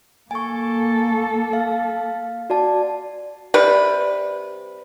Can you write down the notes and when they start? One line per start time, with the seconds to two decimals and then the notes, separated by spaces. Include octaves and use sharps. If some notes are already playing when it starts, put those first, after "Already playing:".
0.31 A#3 A4 G#5 C#6
1.53 F5
2.50 F#4 D5 A5
3.54 C3 G3 B4